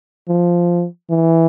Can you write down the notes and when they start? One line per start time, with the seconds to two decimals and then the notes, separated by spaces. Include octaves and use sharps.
0.29 F3
1.11 E3